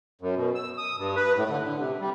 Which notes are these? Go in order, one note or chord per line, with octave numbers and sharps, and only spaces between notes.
F#2
B2
E6
D#6
G2
B4
A2
D3
D3
C3
G3